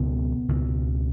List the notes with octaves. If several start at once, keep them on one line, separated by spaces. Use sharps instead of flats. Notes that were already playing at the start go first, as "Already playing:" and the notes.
Already playing: C#2 B2 B3
C#2 B2